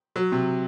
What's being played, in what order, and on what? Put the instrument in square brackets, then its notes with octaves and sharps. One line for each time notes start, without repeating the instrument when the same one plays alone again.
[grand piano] F#3
C3